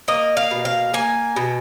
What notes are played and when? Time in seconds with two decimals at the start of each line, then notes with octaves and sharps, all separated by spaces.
0.08 A#3 D#5
0.37 F5
0.51 B2
0.65 F5
0.94 A#3 G#5
1.36 B2